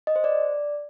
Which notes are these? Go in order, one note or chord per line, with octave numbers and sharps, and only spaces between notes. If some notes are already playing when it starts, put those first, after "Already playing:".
D#5
C5
D5